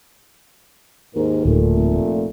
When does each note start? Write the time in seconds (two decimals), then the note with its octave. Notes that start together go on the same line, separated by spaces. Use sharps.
1.15 D#2 G#2 A#4
1.45 D1 A#2 A3
1.76 F1